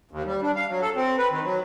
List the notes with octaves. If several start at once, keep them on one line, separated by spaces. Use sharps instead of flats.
D#2
G3
D4
F5
F#3
A4
C4
B4
D#3
F#3